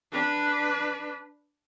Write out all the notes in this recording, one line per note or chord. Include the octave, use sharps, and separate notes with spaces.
D4 B4